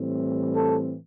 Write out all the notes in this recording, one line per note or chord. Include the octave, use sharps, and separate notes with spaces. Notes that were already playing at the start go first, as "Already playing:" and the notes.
Already playing: A2 E3 G3 C4
A4